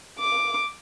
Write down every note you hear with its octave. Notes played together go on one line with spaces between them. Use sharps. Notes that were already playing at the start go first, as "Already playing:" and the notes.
D6